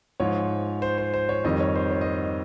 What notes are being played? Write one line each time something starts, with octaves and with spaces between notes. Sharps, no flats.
G#2 F3 C#5
C5
C5
C5
C#5
F2 D#3 G3 D#5
C#5
C5
C#5
D#5
C#5
D#5